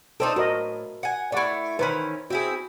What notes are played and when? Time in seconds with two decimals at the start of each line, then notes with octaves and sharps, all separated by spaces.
0.20 C4 D4 D#4 A4 C5
0.36 A2 F#4 A#4 D#5
1.03 F#5 G#5
1.32 A3 E4 D5 F#5 C#6
1.79 D#3 E3 C#4 B4 C5 B5
2.30 C4 E4 F#4 G#4